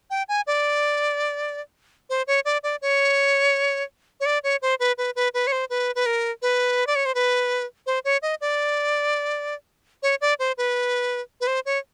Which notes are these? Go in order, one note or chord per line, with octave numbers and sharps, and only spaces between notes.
G5
G#5
D5
C5
C#5
D5
D5
C#5
C#5
D5
C#5
C5
B4
B4
B4
B4
C#5
C5
B4
B4
A#4
B4
D5
C#5
C5
B4
C5
C#5
D#5
D5
C#5
D5
C5
B4
B4
C5
C#5